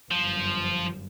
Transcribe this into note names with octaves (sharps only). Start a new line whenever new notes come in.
G1 F#2 F3